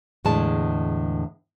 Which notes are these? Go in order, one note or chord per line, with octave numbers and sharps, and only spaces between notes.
E2 A2 D3 G#3 A5